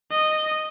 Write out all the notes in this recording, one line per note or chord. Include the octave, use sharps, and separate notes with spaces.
D#5